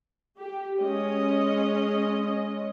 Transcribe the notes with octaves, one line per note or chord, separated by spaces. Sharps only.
G4
G#3 C#4 D#5